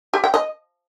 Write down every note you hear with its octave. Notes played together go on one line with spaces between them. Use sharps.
G4
G5
D#5